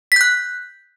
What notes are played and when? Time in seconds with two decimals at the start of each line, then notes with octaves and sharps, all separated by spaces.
0.12 B6
0.16 G6
0.21 F#6